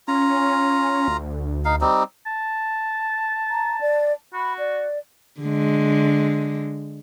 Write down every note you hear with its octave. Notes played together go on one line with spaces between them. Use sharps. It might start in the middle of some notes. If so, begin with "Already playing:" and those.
C#4 F4 A#5
D2
D#4 F5
G3 C4 D#4
A5
A#5
D5
F#4 B5
D5
D3 G#3